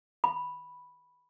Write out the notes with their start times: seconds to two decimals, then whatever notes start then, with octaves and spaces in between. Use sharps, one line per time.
0.24 B5